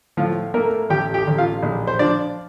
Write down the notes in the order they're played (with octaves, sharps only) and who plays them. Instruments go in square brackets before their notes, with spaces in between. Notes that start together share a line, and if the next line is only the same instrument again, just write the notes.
[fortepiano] A2 F3 F4
A3 A#3 A#4
A1 G4 G5
G4 G5
A1
F4 F5
A#1
C5
F3 D4 D5